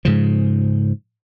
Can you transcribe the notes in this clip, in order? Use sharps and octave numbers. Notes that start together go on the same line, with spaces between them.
G#2 C#3 F3